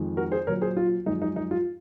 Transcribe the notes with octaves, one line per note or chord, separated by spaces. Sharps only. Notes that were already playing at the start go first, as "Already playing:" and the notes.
Already playing: F2 D#3 G#3
F#4 A#4
G#4 C5
A#2 F#3 A#4 C#5
G#4 C5
F4
F#2 F3 G#3 D#4
D#4
D#4
F4